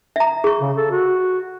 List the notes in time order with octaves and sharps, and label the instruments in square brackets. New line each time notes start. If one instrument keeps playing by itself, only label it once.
[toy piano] E5 A#5
G#4 C#6
[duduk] C#3
A4
F#4